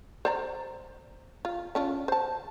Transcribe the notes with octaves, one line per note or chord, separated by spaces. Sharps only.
C5 D5 A#5
F4
C#4 D4 F4
C5 A5